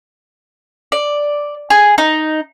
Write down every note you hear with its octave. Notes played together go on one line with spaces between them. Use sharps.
D5
G#4
D#4